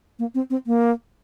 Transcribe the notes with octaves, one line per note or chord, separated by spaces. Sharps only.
A#3
C4
C4
A#3